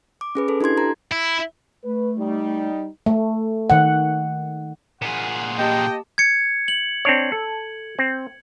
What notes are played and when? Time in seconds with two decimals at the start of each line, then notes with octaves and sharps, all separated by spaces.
0.21 D6
0.35 C#4 G#4 B4
0.48 A4 B4
0.61 D4 E4 G4 C6 G#6
0.77 G4 A4 A#5
1.12 E4
1.84 A3 B4
2.19 G3 D#4
3.06 A3
3.70 D#3 F#5
5.02 A#2 G#4 F#5 C6 B6
5.59 A#3 G4 D#5 G5 A5
6.18 G#6 C#7
6.68 F#7
7.05 C4 D4 C#5
7.32 A4
7.99 C4